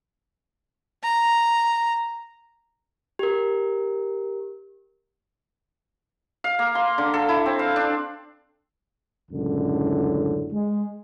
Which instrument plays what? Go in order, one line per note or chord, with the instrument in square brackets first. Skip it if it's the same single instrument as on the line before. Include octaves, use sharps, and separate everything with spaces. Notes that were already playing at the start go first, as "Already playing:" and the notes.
[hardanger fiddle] A#5
[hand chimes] G4 A#4
[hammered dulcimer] F5
A#3
C6
D3
A4
E4
C4
F5
D4
[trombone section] C#2 F#2 A2 D3
G#3